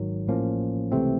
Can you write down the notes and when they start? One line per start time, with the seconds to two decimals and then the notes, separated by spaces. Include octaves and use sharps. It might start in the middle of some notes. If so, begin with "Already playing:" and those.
Already playing: G#1 G#2 D#3 F#3
0.27 A1 A2 F3 A#3 C#4
0.92 C#2 C3 E3 A3 C4